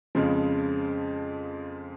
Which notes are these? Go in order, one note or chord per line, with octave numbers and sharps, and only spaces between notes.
F2 C#3 F3 G#3